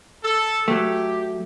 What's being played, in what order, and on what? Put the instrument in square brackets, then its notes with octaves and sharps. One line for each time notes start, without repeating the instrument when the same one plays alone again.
[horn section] A4
[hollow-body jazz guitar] F#3 A3 [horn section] G4